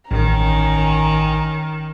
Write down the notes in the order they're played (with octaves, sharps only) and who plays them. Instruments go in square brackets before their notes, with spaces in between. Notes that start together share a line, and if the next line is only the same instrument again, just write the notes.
[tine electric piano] A1 [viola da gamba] D#3 [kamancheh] C#4 A#5